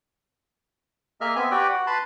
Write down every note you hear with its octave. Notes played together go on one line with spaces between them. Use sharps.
A#3 G#4 D#5 E5 F6
B3 C4 E5 G#5
F#4 G4 B4 D5 G5
F#4 F#5
B4 A5 B5 C6